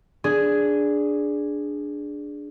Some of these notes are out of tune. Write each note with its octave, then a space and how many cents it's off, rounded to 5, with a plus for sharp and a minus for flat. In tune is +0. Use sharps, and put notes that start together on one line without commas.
D4 +0 G#4 +0